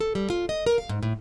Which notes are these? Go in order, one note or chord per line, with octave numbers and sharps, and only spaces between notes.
A4
G3
F4
D#5
A#4
F5
G#2
A2